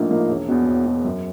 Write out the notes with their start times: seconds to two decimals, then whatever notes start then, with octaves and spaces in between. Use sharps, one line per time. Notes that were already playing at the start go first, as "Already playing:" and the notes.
Already playing: A#1 A2 F3 A#3 D#4
0.10 A2 F3 A#3 D#4
0.28 E1
0.48 E2 B2
0.67 E1
0.86 E2 B2
1.04 F#2